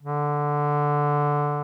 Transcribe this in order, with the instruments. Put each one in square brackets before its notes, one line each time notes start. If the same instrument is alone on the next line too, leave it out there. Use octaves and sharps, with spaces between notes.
[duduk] D3